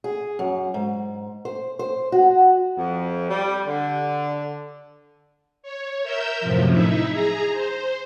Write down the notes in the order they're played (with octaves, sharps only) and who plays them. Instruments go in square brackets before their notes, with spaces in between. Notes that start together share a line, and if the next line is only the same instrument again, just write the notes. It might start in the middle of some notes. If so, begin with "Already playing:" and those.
[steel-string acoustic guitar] G#4
F#2
G#2
C5
C5
F#4
[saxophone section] F2
G3
D3
[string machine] C#5
A#4 E5 E6 G6
F#2 A2 C3 F3
D#4 E4 E5
G#4 A#5
C5